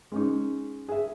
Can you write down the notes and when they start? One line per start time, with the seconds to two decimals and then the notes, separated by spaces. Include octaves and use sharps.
0.12 G#3 C#4 D#4
0.88 G#4 E5